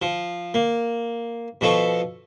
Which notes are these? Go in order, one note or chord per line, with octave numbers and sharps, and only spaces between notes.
F3
A#3
B2 F3 A4 C#6